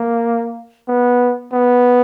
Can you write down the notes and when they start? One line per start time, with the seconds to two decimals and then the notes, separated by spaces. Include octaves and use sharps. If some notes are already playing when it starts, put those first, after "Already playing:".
Already playing: A#3
0.88 B3
1.53 B3